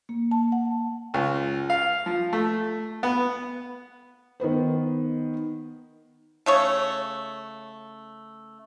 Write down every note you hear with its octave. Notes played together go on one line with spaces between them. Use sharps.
A#3
A5
F#5
C#2
F5
F3
A3
B3
D#3 B3 B4 C5
C#3 A3 C#5